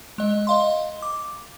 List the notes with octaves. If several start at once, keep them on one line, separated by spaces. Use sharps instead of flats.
G#3 D#5
D#5 F5 C6
D6